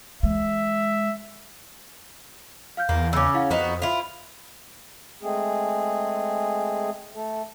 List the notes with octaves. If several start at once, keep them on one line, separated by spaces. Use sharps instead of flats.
E3 G#3 E5
F5 F6 G6
E2 A#3
C#3 C#4 D6 E6
E4 F5 F#5
F2 B3 D#4 F#4 C5
E4 F4
G#3 A3 C4 G#4
A3 A4